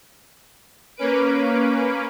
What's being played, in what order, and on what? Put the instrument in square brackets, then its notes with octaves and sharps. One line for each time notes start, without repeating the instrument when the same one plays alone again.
[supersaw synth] A#3 C#4 B4 D7